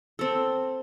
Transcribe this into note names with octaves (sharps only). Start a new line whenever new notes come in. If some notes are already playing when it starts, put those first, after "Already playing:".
C4 A4